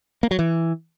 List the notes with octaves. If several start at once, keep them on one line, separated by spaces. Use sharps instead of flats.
A#3
F#3
E3